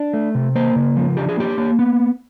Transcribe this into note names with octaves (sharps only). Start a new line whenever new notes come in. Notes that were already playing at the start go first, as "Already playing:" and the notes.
Already playing: D4
A3
C3
A#3 C5
C#3
F3
D4 G4
G#4
A#3 G4
A#3
B3